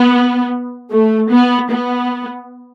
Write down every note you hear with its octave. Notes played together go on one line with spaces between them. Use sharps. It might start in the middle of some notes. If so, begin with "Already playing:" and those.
Already playing: B3
A3
B3
B3